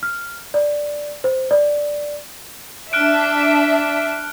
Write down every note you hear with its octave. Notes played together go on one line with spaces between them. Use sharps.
F6
D5
C5
D5
D4 E5 F6 F#6 D7